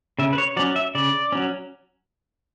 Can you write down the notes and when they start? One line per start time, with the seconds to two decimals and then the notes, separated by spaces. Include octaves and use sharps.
0.19 C#3 E5
0.33 B4
0.38 C#5
0.57 F#3 C#4 D5
0.76 E5
0.95 C#3 D5
1.32 F#3 C#4